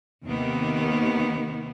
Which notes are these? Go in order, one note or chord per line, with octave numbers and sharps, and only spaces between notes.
D#2 C3 D#3 A#3 B3